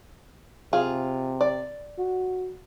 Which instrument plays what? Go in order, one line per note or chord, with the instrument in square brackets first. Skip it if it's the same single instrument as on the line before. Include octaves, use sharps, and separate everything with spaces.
[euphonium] C3 [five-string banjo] F4 G#4
[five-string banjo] D5
[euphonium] F#4